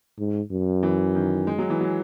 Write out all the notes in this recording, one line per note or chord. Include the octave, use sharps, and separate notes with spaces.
G#2
F#2
E3
D#3
G#3
F#3
E3
F#3